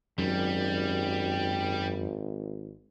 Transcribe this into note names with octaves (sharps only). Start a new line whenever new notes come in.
G#1 F#2 G3